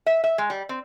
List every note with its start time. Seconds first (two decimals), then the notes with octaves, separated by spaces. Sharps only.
0.06 E5
0.24 E5
0.38 G#3
0.50 G3
0.69 C4